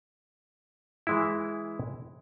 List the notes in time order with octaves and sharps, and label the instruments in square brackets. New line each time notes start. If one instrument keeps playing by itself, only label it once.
[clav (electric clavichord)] E3 G#3 E4